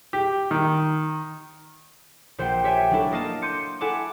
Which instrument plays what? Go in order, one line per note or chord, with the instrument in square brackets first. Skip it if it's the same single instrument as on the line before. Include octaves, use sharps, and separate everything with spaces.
[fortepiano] G4
D#3
[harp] A#1 C5 F#5 G5 G6 C7
G4 C#5 E5 G5 G#5
F#3 A3 C#4 D4 E4 A4
A#3 D#5 F5 A5
C6 D6 G6 C#7 D#7
E4 A4 F#5 G#5 A5 D6